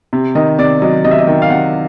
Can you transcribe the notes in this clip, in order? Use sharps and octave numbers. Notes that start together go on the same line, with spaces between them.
C3
D#3 D#5
C3 D5
F#3 D#5
C3 D#5
E5
D#5
D#3 G5
F5
C3 F#5